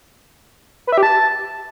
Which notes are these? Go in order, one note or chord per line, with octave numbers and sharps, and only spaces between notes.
B4
E5
G4
A5